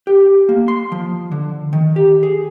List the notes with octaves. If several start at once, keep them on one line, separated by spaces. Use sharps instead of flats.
G4
A#3
C6
F3
D3
D#3
G4
G#4